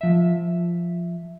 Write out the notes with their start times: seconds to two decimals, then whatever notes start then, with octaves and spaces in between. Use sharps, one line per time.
0.01 F3 E5